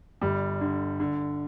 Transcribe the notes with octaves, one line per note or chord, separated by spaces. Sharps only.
G1 G3
D3
D3